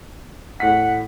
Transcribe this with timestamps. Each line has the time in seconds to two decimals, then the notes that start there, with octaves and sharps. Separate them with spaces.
0.60 A2 F#5 B6